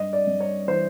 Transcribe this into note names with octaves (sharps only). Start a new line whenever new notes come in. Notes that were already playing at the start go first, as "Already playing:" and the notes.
Already playing: G2 D#5
D5
G2
C#5
E3 C5